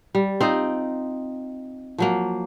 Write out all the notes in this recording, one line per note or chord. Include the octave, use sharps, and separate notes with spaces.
G3
C4 D#4 F4 D#5
F3 F#3 A#3